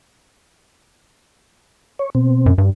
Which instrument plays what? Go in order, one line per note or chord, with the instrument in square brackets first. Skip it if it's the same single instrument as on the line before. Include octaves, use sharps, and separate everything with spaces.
[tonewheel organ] C#5
B2 C4
[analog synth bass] F#2
G2